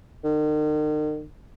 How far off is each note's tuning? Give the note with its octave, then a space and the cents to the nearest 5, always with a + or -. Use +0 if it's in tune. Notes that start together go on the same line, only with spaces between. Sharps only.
D#3 -40